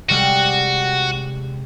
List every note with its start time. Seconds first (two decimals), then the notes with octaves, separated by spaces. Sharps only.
0.09 C3 G3 G#3 F#4